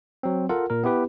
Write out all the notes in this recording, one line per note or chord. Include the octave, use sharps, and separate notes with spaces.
F#3 C4
F4 A4 A#4 F#5
A#2 A#4
B3 E4 G4 B4